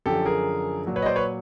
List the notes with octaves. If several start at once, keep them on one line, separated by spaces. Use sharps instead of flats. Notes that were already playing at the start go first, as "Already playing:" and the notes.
F#2 D3 F3 G4 A4
G#4 A#4
A#2 F#3
B4 C#5
D#5
C5 D5
B4 C#5